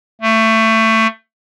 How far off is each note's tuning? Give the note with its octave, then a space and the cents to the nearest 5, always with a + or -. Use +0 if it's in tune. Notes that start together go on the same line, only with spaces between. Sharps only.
A3 +20